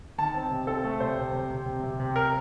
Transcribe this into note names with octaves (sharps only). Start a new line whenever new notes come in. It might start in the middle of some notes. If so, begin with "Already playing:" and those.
D#3 A5
C4
C3
C4 A4
A3
C3 C5
C3
C3
C3
C3
C3
C3
A#4